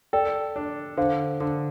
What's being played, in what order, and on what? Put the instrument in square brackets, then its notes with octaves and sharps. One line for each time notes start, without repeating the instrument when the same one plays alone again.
[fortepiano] A4 [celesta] D5 G5
[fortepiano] D4
[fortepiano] D3 [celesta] C5 F5
[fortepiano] D3